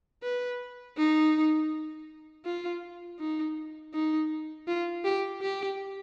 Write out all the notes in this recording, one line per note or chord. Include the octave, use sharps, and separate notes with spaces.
B4
D#4
F4
D#4
D#4
F4
G4
G4